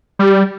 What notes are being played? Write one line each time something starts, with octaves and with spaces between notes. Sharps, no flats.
G3